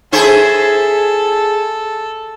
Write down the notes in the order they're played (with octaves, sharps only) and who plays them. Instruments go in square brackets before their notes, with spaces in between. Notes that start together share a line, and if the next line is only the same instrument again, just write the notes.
[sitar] E4 G#4 C5 [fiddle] A4